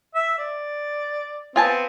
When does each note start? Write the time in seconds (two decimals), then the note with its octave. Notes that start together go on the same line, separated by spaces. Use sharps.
0.15 E5
0.38 D5
1.56 B3 C4 F4 G#5 A5